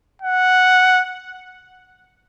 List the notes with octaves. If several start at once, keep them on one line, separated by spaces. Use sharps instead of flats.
F#5